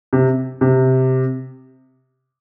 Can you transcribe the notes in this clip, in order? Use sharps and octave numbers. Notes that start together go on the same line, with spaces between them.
C3
C3